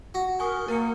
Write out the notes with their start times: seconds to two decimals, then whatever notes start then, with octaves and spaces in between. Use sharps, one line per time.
0.14 F#4
0.40 A#4 G#5 C#6 D#6
0.68 A#3 A#4 C#7